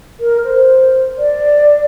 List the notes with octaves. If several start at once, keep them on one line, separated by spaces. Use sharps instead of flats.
A#4
C5
D5